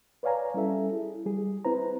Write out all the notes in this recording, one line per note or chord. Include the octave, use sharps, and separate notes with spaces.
B4 C#5 D5 F5 G#5 A#5
G3 C#4 E4 A4 E5
E4 G#4
G3 G#4
C4 E4 B4 C5 A#5